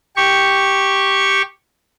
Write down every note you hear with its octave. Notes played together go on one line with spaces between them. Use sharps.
G4 C#6